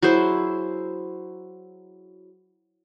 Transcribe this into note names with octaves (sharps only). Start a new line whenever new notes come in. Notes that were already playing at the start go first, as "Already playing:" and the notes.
F#3 E4 G#4 C5